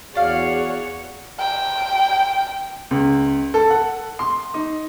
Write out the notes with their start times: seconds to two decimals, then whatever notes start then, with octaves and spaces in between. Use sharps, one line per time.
0.15 E2 F#4 G#4 C#5 D5 F5 F#5
1.39 G5
2.91 C#2
3.54 A4
3.70 F#5
4.19 C6
4.54 D#4